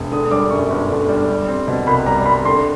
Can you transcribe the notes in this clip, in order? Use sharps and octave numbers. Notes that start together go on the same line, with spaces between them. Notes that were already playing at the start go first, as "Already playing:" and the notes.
Already playing: E1
D3 D#6
G3 D6
F#2 C#6
G1
D3
G3
G3
C4
B2
C2 B5
G3 A#5
C4 B5
D3 C6